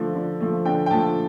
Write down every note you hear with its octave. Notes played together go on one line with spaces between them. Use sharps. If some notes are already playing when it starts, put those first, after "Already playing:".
Already playing: D3 F3 A3
D3
F3 A3
D3 G5
G5
F3 A3 A5